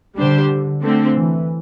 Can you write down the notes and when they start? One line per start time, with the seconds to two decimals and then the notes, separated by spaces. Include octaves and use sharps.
0.17 D3 G3 D4 G4 C5
0.83 D3 A3 C4
1.15 E3